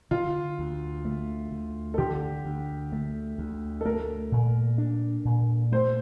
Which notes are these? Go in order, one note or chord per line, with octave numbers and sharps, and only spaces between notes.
D3 F4
D2
A3
D2
A4
D3 G4
D2
A3
D2
A4
A3 A#4
A#2
D4
A#2
A3 C5